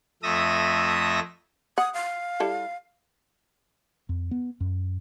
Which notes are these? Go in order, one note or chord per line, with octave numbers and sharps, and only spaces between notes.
F2 A3 E5 D#6 A#6
F#5 D#6
F5
G3 E4 A4
F2
B3
F#2